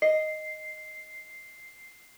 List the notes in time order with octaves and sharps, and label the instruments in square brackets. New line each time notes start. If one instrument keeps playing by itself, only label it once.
[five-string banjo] D#5 [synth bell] C7